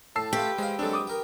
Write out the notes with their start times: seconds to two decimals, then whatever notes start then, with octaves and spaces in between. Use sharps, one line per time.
0.16 A2 A5 E6 C7
0.33 A3 F4 G4 B4
0.58 G#3 C5 F5
0.79 F#3 G#3 C4 D4 A4
0.93 D6 D#6
1.07 A#4 G5